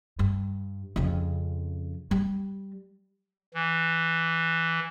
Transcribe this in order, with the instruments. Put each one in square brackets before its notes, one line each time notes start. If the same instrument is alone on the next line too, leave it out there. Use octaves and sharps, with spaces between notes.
[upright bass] G2
F2 C#3
G3
[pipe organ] E3